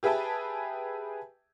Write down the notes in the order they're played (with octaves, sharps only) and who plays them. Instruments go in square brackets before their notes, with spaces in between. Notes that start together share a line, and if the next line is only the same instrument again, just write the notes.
[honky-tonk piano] G4 G#4 B4 E5 G5 A5